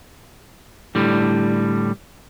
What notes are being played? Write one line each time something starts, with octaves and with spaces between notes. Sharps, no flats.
A2 D3 G3